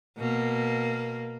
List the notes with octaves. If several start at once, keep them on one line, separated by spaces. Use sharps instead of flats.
B2 A#3